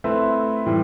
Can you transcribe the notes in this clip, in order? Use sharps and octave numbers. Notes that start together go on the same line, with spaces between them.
A3 C4 E4 B4
A2 E3 G3